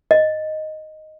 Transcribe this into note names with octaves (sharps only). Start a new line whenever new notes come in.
D#5